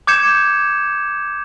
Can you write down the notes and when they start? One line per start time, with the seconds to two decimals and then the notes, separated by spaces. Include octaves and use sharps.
0.07 D6 G6 G#6 C#7 E7